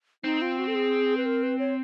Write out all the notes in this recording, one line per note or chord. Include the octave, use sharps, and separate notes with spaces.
C4 D#4
F4
F#4
A4
G#4
B4
A#4
B4
C#5